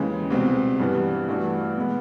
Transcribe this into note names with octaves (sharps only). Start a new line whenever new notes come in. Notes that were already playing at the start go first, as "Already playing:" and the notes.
Already playing: D#2 C#3 E3 G#3
C2 B2 G#3 C4
G2 E3 G3 B3
G2 E3 A3 D4 F#4
B2 G#3 B3